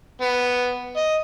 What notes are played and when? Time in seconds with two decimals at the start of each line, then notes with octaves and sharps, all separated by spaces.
0.21 B3
0.97 D#5